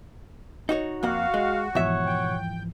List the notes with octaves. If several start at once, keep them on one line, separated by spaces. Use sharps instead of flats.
D#4 F#4 C#5
F2 A#3 F#4 F5 F#5
G#3
G#2 B2 E3 F3 C#5 E5 F#5
G5